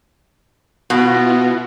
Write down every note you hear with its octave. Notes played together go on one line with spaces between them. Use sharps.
B2 B3 E4 F4